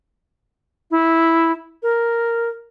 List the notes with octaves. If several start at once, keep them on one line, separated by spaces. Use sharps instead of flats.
E4
A#4